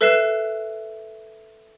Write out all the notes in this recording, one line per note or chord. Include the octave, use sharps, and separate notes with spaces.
A4 B4 E5 F#6 C7 E7